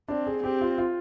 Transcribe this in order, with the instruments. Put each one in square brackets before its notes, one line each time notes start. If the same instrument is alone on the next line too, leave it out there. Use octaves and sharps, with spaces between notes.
[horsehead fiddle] C4 [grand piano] D4
[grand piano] G#4
[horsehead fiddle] C4 [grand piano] G4
[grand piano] F4
F4